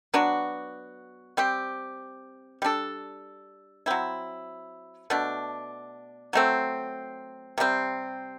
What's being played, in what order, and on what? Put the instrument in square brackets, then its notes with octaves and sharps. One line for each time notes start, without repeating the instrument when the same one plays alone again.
[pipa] F#3 B3 D4 F#4
G3 C4 G4
G3 D4 A4
F#3 C4 E4
B2 A3 D4
F#3 A3 C4
C3 G3 C4